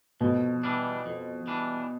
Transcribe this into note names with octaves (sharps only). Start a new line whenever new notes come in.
F2 B2
E3 G3 D4
F2
E3 G3 D4